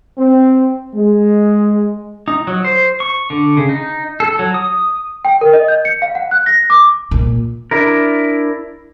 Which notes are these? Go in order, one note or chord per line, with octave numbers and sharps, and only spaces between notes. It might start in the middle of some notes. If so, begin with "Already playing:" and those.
C4
G#3
D#4
F#3
C5
C#6
D3
C#3
D#4
A4
F#3
D#6
G5
A#4
D#5
G6
C#7
F5
F#5
F#6
A#6
D6
A#2
D4 E4 A#4